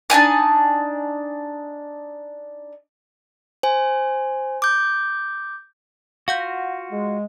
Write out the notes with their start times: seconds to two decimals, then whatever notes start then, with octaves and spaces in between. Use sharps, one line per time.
0.10 D4 D#4 G#5 A5
3.63 C5 G#5
4.62 D6 G6
6.28 F4 F#4 F5 F#5 G6
6.90 G#3